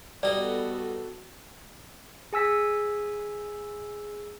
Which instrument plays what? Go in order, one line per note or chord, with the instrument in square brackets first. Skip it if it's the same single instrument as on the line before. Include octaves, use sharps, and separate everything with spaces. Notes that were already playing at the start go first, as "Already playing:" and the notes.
[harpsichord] G3 D#4 [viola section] B3 F#4 A4 [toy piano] D5
[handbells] G#4 G#5 E6 B6